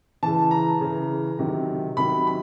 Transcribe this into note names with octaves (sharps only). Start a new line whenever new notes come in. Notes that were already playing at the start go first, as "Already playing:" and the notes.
C#3 E3 A5
A#5
C#3 E3
C3 D#3 F#3
C3 D#3 F#3 B5
B5